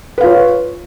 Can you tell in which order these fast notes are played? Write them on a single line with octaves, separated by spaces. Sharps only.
B4 F5 F4 C#5